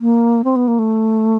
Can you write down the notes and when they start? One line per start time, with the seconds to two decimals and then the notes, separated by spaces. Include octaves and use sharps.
0.01 A#3
0.44 C4
0.56 B3
0.68 A#3
0.79 A3